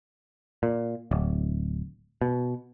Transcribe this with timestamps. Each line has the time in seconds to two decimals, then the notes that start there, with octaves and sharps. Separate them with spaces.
0.63 A#2
1.11 D1
2.21 B2